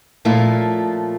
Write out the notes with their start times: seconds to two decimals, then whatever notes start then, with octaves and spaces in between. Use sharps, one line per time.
0.25 A#2 F3 A3 C#4 E4 F4